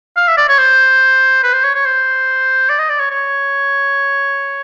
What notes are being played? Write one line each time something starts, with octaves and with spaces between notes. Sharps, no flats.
F5
E5
D5
C#5
C5
B4
C5
C#5
C#5
C5
D5
D#5
D5
C#5
C#5